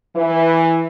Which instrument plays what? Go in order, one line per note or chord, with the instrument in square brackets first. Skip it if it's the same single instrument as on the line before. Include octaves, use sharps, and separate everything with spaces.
[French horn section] E3